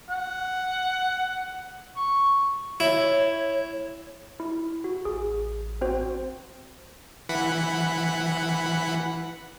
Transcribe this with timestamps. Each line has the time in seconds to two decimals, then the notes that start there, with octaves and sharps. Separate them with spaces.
0.09 F#5
1.96 C#6
2.80 E4 C#5
4.40 E4
4.84 F#4
5.05 A1 G#4
5.81 C4 F#4 C5
7.29 E3 F#5 B5